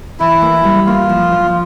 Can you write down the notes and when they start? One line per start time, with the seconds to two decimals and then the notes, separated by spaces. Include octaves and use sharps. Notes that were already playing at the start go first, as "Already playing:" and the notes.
0.20 E3 E4
0.42 A#3
0.64 G3
0.87 A#3 F4
1.09 F3
1.31 F3